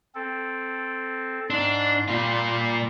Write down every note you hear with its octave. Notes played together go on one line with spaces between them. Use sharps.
C4 A4
G#2 D4 C6
A#2 G3 F4 C6